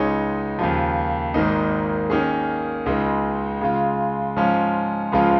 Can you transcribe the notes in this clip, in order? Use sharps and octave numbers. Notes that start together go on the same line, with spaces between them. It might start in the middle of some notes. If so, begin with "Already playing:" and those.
Already playing: C#2 C#3 G#3 D#4 C#5
D#2 C#3 F3
G#1 G#2 D#3 A#3 D#4
D#3 A#3 C#4 G#4
C#2 C#3 G#3 D#4
C#3 G#3 F4
G#2 F3 C#4 F4
C#2 C#3 F3 G#3 F4